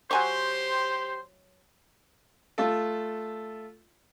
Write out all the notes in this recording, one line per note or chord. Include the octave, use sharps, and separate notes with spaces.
F#3 G4 C5 G#5 C#6
A3 F4 A4